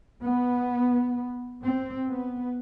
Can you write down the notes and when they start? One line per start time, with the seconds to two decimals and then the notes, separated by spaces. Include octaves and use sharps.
0.23 B3
1.63 C4
2.09 B3